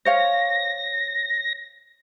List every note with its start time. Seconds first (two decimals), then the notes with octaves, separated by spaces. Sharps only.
0.05 C5 C#5 F5 A#6